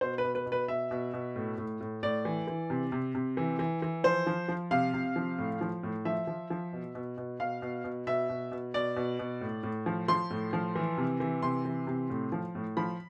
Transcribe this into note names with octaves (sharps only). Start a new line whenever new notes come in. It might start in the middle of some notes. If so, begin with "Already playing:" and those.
B2 C5
B4
B2
B4
B2
B4
B2 E5
B2
B2
A2
A2
A2
A2 D5
E3
E3
C3
C3
C3
E3
E3
E3
F3 C5
F3
F3
C3 F5
C3
F3
A2
F3
A2
F3 E5
F3
F3
B2
B2
B2
B2 F5
B2
B2
B2 E5
B2
B2
B2 D5
B2
B2
A2
A2
F3
F3 C6
A2
F3
E3
C3
E3
C3 C6
E3
C3
A2
F3
A2
F3 B5